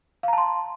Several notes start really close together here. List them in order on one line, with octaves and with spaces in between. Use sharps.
F5 A#5 A5 C6